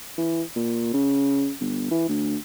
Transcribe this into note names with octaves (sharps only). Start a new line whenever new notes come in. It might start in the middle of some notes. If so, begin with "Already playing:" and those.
E3
A#2
C#3
G1
E3
D2